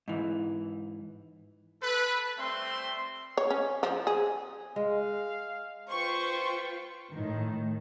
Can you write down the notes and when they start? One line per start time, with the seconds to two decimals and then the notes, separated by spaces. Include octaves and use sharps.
0.08 G#2 E3
1.83 A4 B4
2.38 G3 A3 C4 E5 C6
3.37 C#5
3.50 C#4
3.83 F3
4.07 G#4
4.76 G#3 F5
5.90 F4 B4 C5 G5 C#6 C#7
7.11 A2 D#3